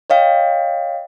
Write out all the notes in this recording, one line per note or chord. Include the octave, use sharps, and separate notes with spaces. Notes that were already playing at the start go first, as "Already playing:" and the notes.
C#5 D#5 F5 G5